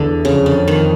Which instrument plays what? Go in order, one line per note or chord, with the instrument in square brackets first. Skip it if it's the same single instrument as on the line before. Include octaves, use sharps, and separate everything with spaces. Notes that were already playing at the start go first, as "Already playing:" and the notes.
Already playing: [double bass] E2 [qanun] D3
[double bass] F2 [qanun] C#3
[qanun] D3
D#3